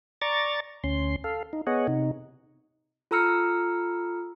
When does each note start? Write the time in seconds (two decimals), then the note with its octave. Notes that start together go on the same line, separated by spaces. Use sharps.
0.22 D5 A#5 C#6 D6 A6
0.84 D2 C#4 C6
1.24 A4 F5
1.53 D#4
1.67 B3 G#4 C#5 D#5 F#5
1.87 C3 D#4
3.11 F4 A4 A#5 E6 F6 C#7